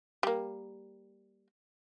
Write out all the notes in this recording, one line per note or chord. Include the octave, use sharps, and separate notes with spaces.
G3 A#3